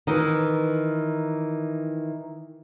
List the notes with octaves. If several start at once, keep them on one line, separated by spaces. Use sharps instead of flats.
D#3 E3